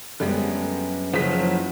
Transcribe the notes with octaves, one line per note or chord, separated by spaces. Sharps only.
F#2 D3 G3 G#3 B3
F#1 C#3 F3 F#3 B6